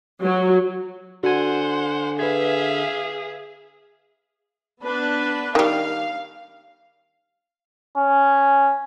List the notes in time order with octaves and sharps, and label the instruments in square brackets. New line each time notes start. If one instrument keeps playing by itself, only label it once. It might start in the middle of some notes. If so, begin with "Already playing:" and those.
[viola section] F#3
[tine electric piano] D3 G#5 [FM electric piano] F#4 [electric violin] C5 F#5
[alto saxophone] G#4 [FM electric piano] B4 G#6 [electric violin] E5 F5
[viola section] B3 D4 B4
[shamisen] D#3 G3 [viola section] F5
[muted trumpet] C#4